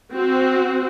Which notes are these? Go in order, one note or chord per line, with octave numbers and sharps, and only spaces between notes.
C4 F#4